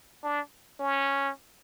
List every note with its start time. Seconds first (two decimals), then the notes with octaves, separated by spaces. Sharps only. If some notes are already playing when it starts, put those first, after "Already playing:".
0.24 D4
0.80 C#4